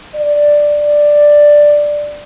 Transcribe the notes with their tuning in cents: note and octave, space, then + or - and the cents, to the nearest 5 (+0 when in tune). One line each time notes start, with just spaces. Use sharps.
D5 +5